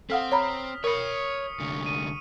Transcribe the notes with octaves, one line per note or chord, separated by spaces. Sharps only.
C4 A4 F5 F#5 D#6 F6 B6
C#5 A#5 B5
A#4 C#5 B5 C#6 D#6 C#7
C2 D3
D#7